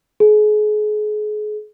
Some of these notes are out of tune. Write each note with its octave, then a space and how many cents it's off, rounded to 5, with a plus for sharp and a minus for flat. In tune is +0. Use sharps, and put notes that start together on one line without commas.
G#4 +35